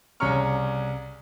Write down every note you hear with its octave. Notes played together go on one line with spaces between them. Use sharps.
C2 C#3 C#5 A#5 C#6 F6